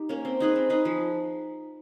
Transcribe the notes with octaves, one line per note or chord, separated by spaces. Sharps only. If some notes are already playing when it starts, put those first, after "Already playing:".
Already playing: D#4 G4
A#3 C#4
C4
D#4 G#4 B4
C4
D#4 G#4 B4
F3